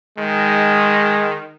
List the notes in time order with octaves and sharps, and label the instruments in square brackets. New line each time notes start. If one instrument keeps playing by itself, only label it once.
[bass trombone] D#3 [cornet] G#3